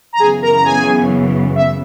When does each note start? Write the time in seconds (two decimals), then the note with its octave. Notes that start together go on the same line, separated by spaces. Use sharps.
0.13 A#5
0.19 F#2 C#3 E3 B3 G#4 G#5
0.42 A#4 A#5
0.54 A#5
0.65 G#4 G#5
1.55 E5